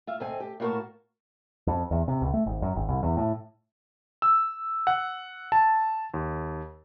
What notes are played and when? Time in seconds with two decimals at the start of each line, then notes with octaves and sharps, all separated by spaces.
0.07 F4 E5 F5
0.20 D2 G#2 C4 A4 G#5
0.40 G4
0.60 A2 A#3 D#4 F#4 A#4 A5
1.67 F2
1.91 E2
2.08 C3
2.22 C#2
2.34 A3
2.46 G#1
2.62 F#2
2.76 G#1
2.88 C2
3.03 E2
3.17 A2
4.22 E6
4.87 F#5
5.52 A5
6.14 D#2